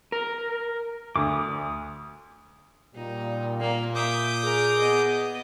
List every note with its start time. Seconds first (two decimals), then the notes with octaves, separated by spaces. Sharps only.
0.12 A#4
1.16 D2 D6 D#6
2.95 A#2 G3 D#4
3.60 A#3
3.95 E5 D6 D#6 G6
4.44 G#4 A#4
4.78 B3 D#5